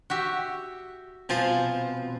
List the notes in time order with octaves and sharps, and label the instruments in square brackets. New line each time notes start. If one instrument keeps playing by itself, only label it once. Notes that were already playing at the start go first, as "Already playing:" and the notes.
[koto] F#4 G4 E5
[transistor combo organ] B2 C4 [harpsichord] F3 F5 [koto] C5 G#5 A5